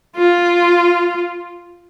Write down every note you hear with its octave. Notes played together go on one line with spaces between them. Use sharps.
F4